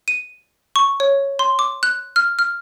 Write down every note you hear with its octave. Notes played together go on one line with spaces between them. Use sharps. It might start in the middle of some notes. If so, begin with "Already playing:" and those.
D#7
C#6
C#5
C6
D6
F#6
F6
F6